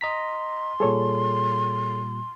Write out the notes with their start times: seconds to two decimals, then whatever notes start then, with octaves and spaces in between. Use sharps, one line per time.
0.01 D#5 A#5 C6 B6
0.80 A#2 G3 G#4 A4 C#5